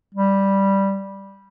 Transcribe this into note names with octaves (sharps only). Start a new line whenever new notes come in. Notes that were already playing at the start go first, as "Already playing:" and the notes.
G3